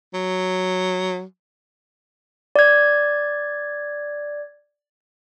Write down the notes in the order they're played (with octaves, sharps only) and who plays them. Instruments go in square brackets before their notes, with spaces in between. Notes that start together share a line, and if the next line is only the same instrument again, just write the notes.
[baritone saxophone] F#3
[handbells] D5 G#6